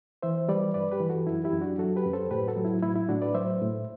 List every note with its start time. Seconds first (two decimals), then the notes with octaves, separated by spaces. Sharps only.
0.23 E3 C5 E5
0.49 G3 B4 D5
0.74 G2 B4 D5
0.91 G4 B4
1.00 E3
1.09 F#4 A4
1.27 F#2 E4
1.44 E4 G4
1.52 F#2
1.62 D4 F#4
1.78 F#3 F#4 A4
1.96 G4 B4
2.05 F#2
2.13 A4 C5
2.31 A2 G4 B4
2.47 F#4 A4
2.56 F#3
2.65 E4
2.82 A2 E4
2.96 E4
3.09 A2 D4 F#4
3.22 B4 D5
3.34 F#3 C5 E5
3.61 A2